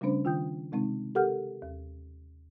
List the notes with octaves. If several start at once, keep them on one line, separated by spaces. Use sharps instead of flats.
C#3 G3 A3 C#4 D4 C5
D#3 F4 G5 D#6 G6
C3 G#3 C4 D#4
G4 A4 A#4 F#5 F6 G6
D#2